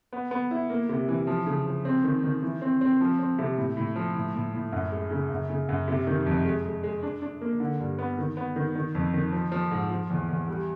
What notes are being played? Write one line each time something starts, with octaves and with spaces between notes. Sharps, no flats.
B3
B3
E4
A#3
C3
E3
F3
C#3
F3
C4
D#3
D#3
E3
C4
C4
F3
C4
C3
A2
A2
F3
A2
A2
A2
F#2
G#3
C#3
F#2
C#3
F#2
C3
D#3
F2
G#3
G#3
G#3
D4
D4
A#3
D3
G2
B3
D#3
B3
D#3
D#3
F2
D#3
F3
F3
G#2
F3
E2
E2
G3